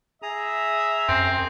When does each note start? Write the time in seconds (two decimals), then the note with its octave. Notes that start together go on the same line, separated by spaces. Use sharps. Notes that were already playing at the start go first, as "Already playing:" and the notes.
0.22 G#4 E5 A#5 D#6
1.09 F#2 C4